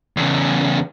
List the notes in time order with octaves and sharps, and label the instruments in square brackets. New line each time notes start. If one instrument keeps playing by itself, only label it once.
[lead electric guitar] E2 C#3